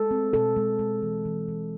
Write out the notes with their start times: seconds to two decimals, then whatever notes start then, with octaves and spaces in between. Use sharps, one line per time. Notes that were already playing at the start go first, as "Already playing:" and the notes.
Already playing: G#3 A4
0.11 C4
0.33 B2 A4
0.56 G#3
0.79 G#3
1.02 E3
1.25 E3
1.48 E3